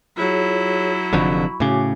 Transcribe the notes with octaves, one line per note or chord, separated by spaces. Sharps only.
F#3 E4 F4 G#4 C#5
F1 F2 D3 B5 C#6
A2 C#3 F#4 G#5 D6